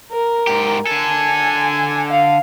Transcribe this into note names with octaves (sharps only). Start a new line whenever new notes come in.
A#4
G#2 G4
D3 A4 G#5
F5